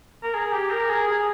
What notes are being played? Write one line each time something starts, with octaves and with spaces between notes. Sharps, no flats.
A#4
G#4
G4
A#4
G#4
G#4